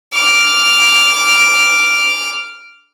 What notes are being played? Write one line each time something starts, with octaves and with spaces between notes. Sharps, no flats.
D6 F6